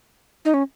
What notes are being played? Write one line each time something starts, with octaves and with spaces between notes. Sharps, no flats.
D#4
C#4